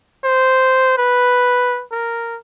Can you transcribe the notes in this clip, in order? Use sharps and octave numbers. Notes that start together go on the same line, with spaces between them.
C5
B4
A#4